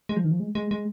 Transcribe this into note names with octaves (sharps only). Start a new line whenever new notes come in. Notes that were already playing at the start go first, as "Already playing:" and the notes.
G#3
F3
D#3
F3
G#3
G#3
G#3